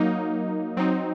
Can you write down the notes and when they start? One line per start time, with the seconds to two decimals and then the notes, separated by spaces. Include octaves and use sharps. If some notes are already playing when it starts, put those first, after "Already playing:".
Already playing: F#3 A#3 D#4
0.77 F#3 C4 D#4